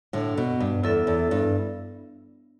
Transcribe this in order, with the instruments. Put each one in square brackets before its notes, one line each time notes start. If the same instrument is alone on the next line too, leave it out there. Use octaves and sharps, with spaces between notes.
[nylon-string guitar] A2 D3
B2
G2
[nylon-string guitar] E2 [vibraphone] E4 A4 E5
[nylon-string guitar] E2
G2